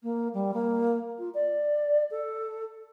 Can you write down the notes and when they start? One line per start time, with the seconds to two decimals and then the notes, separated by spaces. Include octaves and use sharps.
0.03 A#3
0.33 G3
0.53 A#3
1.18 F4
1.34 D5
2.10 A4